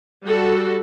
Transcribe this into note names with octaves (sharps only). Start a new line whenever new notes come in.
G3 F#4 A4